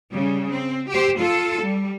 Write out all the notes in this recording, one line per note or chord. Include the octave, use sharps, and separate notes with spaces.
C#3 G3
C4
G4 C5
F4 A4
G3